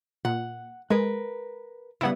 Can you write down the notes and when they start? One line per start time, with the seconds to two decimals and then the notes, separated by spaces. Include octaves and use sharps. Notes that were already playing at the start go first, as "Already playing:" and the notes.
0.25 A#2 F#5
0.90 G#3 A#4 B4
2.01 C#3 G3 B3 E4 F#5